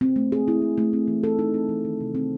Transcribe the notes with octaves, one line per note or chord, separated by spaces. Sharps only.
C4
A3
G#4
E4
C4
A3
C4
E3
A4
D#4
C4
E3
D#3
C3
C4